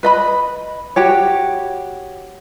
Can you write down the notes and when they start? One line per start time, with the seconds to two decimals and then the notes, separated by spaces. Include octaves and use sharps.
0.03 B4 D#5 B5
0.96 F#4 G4 C#5